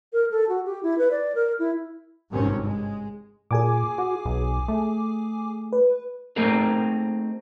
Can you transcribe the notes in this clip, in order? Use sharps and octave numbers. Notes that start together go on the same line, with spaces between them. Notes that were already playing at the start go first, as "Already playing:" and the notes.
A#4
A4
F#4
G4
E4
B4
D5
A#4
E4
G#1 G2 C3 D#3 C4 C#4
G#3
A#2 G#4 G#5 D6
F#4
B1
A3
B4
A3 A#3 C4 D#4 G#4 A#4